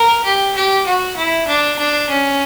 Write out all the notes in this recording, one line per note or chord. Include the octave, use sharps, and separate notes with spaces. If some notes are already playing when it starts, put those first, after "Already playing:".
Already playing: A#4
G4
G4
F#4
E4
D4
D4
C#4